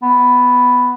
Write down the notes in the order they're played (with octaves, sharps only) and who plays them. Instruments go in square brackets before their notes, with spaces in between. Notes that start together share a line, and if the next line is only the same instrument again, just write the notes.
[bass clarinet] B3